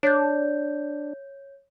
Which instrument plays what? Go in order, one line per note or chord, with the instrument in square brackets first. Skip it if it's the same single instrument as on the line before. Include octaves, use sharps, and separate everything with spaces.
[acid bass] D4 [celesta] C#5 G6